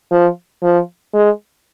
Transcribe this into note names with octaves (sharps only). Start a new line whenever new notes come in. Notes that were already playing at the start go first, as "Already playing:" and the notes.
F3
F3
G#3